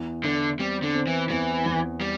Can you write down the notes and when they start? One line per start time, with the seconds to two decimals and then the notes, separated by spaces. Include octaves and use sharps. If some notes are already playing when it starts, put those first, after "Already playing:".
Already playing: E2
0.24 D3 E3
0.59 G3 C4
0.83 D3
0.95 C4
1.07 E3
1.29 E2 E3
1.66 E2
2.01 G3